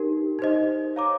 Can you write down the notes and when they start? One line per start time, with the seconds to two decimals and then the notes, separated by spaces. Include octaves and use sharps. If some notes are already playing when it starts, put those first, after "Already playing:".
Already playing: D#4 G4 A#4
0.39 D#4 G4 C5 D#5
0.96 C#5 F5 A#5 D6